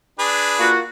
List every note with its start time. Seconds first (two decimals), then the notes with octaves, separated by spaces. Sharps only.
0.19 D4 G#4 B4
0.60 A#3 F4 F#4